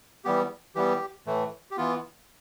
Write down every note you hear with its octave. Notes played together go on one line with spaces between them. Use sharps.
E3 G3 B3 G4
E3 G3 B3 G4
A2 E3 A3
G4
E3 B3 F4